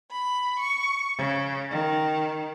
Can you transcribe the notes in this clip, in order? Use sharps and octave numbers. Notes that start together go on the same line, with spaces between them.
B5
C#6
C#3
D#3